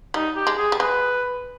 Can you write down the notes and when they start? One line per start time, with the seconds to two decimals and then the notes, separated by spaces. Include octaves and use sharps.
0.14 G3 D#4
0.36 G4
0.47 G#3
0.58 G#4
0.72 G3
0.79 G#3 B4